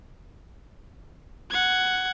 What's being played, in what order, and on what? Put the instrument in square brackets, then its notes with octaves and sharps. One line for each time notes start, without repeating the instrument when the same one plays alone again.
[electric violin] F#5 G#6